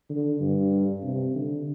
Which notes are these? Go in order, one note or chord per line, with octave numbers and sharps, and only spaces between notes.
D3
G2
C3
D3